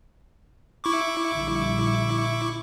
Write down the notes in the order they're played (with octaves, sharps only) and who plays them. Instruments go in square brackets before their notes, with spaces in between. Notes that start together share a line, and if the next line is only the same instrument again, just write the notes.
[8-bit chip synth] E4 C#6 D6
[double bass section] A#1 D3 G3